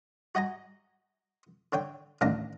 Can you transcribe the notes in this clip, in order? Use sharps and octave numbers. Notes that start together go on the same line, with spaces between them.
F#4 D#5 G#5 A#5
D3 C#5 G5
A1 D2 D#3 D4 F5 A#5